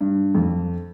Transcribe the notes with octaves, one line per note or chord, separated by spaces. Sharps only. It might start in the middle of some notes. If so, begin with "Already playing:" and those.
G2
F2